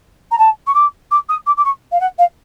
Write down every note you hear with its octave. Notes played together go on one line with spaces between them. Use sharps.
A#5
A5
C#6
D6
D6
D#6
D6
D6
C#6
F5
F#5
F5